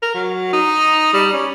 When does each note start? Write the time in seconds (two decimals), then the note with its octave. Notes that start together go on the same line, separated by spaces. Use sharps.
0.02 A#4
0.15 F#3
0.53 D#4
1.13 G3
1.33 C#4